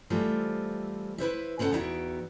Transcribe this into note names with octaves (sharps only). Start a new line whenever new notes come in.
E3 G3 A3 C4 F4 C5
E4 B4 C5 E5
C#3 C4 E4 A4 F#5 A5
E2 B3 D#4 E4 F#4 G5